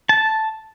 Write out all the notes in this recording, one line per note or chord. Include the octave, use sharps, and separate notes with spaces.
A5